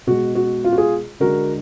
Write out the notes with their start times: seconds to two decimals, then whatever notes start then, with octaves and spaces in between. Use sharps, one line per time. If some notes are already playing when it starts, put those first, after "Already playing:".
0.07 B2 G#3 F#4
0.35 F#4
0.64 F4
0.72 F#4
0.78 F4 G#4
1.20 D3 G#3 F#4 A#4